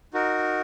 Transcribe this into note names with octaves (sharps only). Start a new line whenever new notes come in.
D#4 F#4 A#4